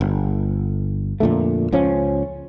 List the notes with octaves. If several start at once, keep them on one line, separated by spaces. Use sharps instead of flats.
G1
F2 A#2 D3 A3
C#2 F3 C#4